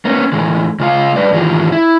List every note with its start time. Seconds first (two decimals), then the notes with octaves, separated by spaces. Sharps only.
0.05 A#3 B3 C#4
0.33 A2 E3 G#3
0.80 C#3 G#3 F4 D5 F5
1.16 G3 B4 D5
1.33 G#2 D#3 E3 F4 G4 G#4
1.72 E4